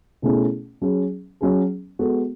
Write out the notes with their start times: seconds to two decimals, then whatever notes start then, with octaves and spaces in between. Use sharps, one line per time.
0.22 B2 A3 C#4 E4 G#4
0.82 F#3 C#4 G#4
1.41 F#3 C#4 G#4
1.99 G#3 B3 F#4 A4